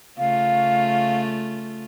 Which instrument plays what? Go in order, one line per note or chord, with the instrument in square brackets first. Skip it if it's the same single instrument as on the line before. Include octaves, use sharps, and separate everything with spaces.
[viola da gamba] C#3 A3 F4 [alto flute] F5